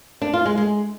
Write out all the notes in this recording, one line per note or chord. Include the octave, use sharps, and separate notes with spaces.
D4
F4
G#3
G#3